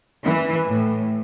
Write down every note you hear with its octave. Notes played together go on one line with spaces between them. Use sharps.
E3
A2